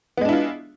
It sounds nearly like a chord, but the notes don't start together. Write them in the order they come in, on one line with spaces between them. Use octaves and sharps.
B3 G#3 D4 E4 F4